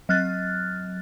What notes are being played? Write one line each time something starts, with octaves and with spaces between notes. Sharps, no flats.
F#3 F6 F#6 A6